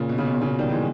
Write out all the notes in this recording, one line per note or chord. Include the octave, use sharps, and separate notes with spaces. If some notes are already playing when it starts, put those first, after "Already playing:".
Already playing: A#2 C#3
B2
C#3
B2
A#2
C#3
B2
D#3 G3
E3 G#3